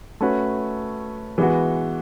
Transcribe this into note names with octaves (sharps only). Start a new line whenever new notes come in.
A3 C#4 F#4 B4
E3 G#3 B3 F#4